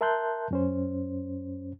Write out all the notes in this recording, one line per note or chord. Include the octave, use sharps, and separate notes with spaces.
A#4 E5 A5 C6 F#6 G6
F#2 C#4 C5